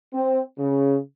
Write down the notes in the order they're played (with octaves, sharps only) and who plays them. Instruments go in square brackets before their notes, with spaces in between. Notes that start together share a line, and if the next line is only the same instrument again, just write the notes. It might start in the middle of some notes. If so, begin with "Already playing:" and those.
[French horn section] C4
C#3